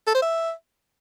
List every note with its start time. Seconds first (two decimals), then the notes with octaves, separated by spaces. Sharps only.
0.07 A4
0.15 C5
0.22 E5